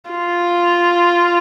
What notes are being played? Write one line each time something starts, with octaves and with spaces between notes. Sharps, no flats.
F4